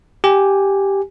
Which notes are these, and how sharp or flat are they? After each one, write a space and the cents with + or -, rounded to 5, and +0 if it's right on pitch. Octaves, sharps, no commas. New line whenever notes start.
G4 +0 G#5 -10